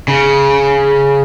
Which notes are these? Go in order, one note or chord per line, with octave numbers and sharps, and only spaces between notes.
C#3